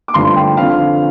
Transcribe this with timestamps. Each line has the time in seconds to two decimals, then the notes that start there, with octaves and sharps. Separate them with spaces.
0.08 D6
0.14 G2 D3 F3 A3 C6
0.36 G5
0.57 F2 D3 F3 F5